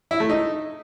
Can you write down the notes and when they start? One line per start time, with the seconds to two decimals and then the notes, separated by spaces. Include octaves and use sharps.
0.11 E4
0.20 A3
0.29 D#4